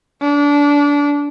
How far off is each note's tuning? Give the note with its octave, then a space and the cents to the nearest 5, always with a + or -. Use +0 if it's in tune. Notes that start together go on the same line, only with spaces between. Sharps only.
D4 -25